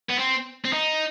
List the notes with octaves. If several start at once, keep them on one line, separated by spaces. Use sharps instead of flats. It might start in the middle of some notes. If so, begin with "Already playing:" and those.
B3
C4
C4
D#4